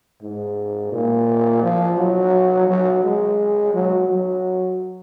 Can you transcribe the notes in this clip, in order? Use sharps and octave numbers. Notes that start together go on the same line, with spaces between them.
G#2
A#2
F3
F#3
F#3
G#3
F#3
F#3